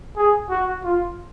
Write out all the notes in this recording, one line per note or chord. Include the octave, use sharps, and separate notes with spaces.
G#4
F#4
F4